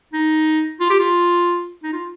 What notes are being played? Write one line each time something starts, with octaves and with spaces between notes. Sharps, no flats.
D#4
F4
G4
F4
D#4
F4